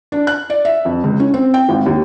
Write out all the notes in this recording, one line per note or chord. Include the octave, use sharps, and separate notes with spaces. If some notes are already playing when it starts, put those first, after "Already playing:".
D4
F#6
D5
E5
F2
C#2
C#4
C4
G5
G#1
D#2